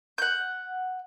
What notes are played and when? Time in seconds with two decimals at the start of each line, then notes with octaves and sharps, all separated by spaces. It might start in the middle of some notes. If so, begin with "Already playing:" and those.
0.18 F#5 G6